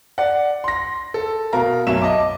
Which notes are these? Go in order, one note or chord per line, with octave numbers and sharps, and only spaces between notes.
D5 F#5
C6 A#6
A4
B2 A#4 F5 A#5
B1 F#2 E5 E7
D#5 A5 D6